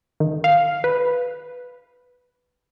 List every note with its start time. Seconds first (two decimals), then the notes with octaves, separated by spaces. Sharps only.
0.20 D#3
0.44 F5
0.84 B4